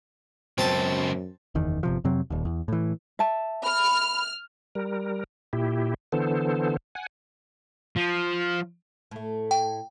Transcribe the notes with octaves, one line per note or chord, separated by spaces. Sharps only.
C#2 F#2 B2 C4 A5
F#1 E2 D#3
G1 C3 F3
F2 C3 F#3 C4
D#1 D#2
E2
A2 E3
E5 A5
B5 F6
G3 A#4
A#2 E4 G4
D3 E3 B3 A4 C5
F#5 G#5
F3
A2 A3
G5